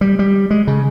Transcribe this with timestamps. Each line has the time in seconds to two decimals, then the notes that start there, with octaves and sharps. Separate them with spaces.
0.01 G3
0.19 G3
0.51 G#3
0.67 C#3